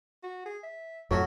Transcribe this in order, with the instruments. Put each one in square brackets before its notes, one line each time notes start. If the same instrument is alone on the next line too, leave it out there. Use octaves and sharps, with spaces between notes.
[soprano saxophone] F#4
G#4
E5
[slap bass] F2 A2 [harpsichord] F#3 C#4 F#4 [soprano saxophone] A3